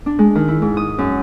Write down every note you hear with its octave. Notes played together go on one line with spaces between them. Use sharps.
D4
G#3
D#3
E4
G#2
D#6
F#2